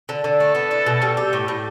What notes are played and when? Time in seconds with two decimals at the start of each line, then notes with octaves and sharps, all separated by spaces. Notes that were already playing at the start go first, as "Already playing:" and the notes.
0.09 D3
0.24 D3 A4
0.40 A3
0.55 B3
0.71 E4
0.86 B2
1.02 G3
1.17 G4
1.33 A2
1.48 A2